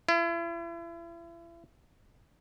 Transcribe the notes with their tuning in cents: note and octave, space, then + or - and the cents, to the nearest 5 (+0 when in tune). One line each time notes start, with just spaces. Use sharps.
E4 +40